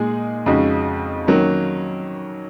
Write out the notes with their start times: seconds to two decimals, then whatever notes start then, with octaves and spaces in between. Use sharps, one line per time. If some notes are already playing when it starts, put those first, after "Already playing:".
Already playing: A#2 G#3 D#4 G#4
0.46 F2 C#3 G#3 D#4 F#4
1.27 D#3 F#3 A#3 C#4